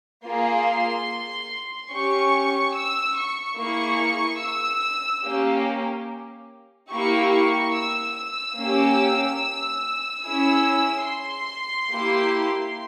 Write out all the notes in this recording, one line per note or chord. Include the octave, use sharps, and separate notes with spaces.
A#3 F4 G#4 C6
C#4 G4 C#6
E6
C#6
A#3 E4 G#4 C#6
E6
A#3 C#4 G4
A#3 E4 G4 C#6
C#6
E6
E6
A#3 C#4 G4
C#4 E4 G#4 E6
C6
A#3 E4 G4